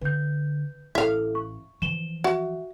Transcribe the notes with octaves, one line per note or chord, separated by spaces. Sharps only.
D3 B4 G6
A1 E4 A4 E5 F5
C#6
E3 F3 E7 G7
F#4 E5